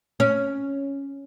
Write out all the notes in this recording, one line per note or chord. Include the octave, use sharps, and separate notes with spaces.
C#4